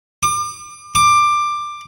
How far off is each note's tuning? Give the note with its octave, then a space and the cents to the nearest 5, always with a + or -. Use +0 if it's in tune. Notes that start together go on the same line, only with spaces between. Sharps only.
D6 +35
D6 +15